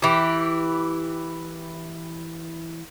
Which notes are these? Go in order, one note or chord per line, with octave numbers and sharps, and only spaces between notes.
E3 G4